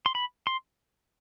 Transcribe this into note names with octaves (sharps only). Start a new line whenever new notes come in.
C6
B5
C6